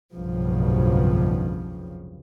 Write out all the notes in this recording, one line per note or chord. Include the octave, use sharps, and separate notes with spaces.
F1 B1 G2 C#3 F3